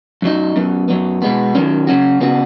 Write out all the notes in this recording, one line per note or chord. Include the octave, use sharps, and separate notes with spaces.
F#2 F#3 D#4
F#2 F#3 B3
F#2 F#3 B3
B2 G#3 B3
D#3 F#3 C#4
C#3 F#3 C#4 F#4
C#3 B3 F#4